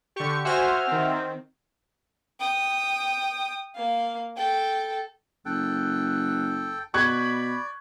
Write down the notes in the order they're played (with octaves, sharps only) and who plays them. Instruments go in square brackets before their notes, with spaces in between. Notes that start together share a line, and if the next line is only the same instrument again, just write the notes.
[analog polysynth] D3 G4 [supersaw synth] C#6
[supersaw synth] F#4 C5 G#5 [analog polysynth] E5 F#5 F6
[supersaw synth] D#3 C4
[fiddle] G5 D#6
A#3 F5
A4 G5
[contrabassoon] F#1 [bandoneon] A4 G5 [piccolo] F#6
[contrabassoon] B2 [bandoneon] D5 [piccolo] B5 [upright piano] C#6 F#6 G#6